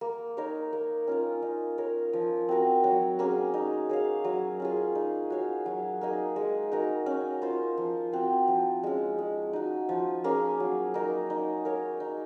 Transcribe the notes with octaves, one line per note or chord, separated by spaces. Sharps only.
A#3
D#4 A#4 C#5
A#3
C#4 F4 A#4
D#4
A#4 C#5
F3
C4 F#4 A#4
F#3
A#3 C#4 G#4
D#4
G#4 C#5 F5
F#3
C#4 F4 G#4
D#4
F#4 C#5 F5
F#3
A#3 D#4 G#4
G#3
D#4 F#4 A#4
C#4
F4 C5
F3
C4 F#4 C5
F3
G#3 C#4
G#3
D#4 F#4
F3
A#3 C#4 G#4
F#3
A#3 D#4 A#4
D#4
A#4 C#5
D#4